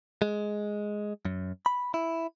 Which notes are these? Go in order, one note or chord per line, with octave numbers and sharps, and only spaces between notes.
G#3
F#2
B5
E4